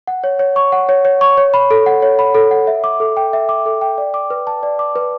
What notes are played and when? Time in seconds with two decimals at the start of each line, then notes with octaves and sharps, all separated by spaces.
0.07 F#5
0.24 C#5
0.39 C#5
0.56 C#6
0.72 F#5
0.89 C#5
1.05 C#5
1.21 C#6
1.37 C#5
1.54 B5
1.71 A4
1.86 F#5
2.02 C#5
2.19 B5
2.35 A4
2.51 F#5
2.67 E5
2.84 D6
3.00 A4
3.17 G5
3.33 E5
3.49 D6
3.66 A4
3.81 G5
3.98 D5
4.14 D6
4.30 B4
4.47 A5
4.63 D5
4.79 D6
4.96 B4